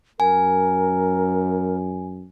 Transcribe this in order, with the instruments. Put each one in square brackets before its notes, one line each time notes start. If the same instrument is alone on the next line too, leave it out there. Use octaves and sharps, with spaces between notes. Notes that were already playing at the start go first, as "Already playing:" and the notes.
[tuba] F#2 [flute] A#4 [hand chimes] G#5